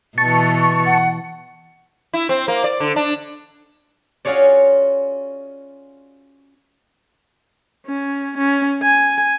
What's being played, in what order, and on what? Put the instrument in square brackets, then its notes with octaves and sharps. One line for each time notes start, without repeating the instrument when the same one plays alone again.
[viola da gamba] B2 E3 [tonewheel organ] A5 C#6
[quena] F#5
[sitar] E4
C4
A#3
D5
D3
D4
[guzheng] C#4 F4 F#4 G#4 C#5 D5
[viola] C#4
C#4
G#5